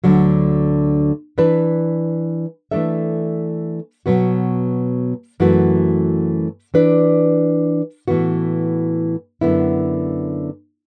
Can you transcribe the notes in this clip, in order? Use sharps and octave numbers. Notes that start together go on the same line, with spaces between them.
D2 D3 F#3
E3 D4 B4
E3 A3 D4 A4 E5
B2 F#3 B3 F#4
F#2 E3 A3 F#4
E3 D4 B4 D5
A2 E3 B3 F#4
F#2 D3 B3 E4